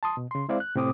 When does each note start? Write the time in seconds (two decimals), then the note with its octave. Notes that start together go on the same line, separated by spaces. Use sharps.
0.03 A5 C6 D#6
0.17 B2
0.31 C#3 C6
0.49 G#3 C4 E4 C5 D5 F5
0.60 F#6
0.76 A2 C3 C4 D6 D#6